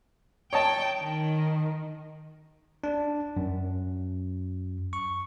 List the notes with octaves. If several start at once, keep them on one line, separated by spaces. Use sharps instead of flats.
C#5 D#5 G5 A5
D#3
D4
F#2
C#6